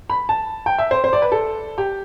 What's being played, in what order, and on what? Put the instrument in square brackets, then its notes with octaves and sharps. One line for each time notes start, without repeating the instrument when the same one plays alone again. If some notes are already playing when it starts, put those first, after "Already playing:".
[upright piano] B5
A5
G5
E5
C5
C5
D5
B4
A4
G4